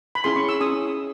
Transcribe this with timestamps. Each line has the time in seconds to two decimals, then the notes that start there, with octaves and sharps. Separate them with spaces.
0.15 B5
0.24 C#4 E4 G#4 C6
0.36 C#6
0.49 E6
0.60 C#4 E4 G#4 D#6